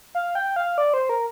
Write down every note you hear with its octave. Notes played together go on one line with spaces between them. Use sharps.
F5
G5
F5
D5
C5
A#4